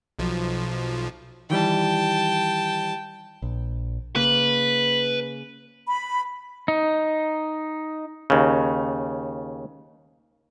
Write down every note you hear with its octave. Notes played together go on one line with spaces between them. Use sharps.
B1 F3
D#3 E3 G3 G5 A5
A#1
C#3 A#3 B4
B5
D#4
D#2 C#3